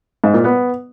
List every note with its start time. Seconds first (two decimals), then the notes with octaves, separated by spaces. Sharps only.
0.24 G#2
0.34 A#2
0.44 B3